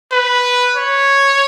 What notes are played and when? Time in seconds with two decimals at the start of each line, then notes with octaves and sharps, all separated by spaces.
0.12 B4
0.76 C#5